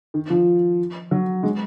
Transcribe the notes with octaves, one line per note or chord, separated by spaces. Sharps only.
D#3
F3
F#3
G#3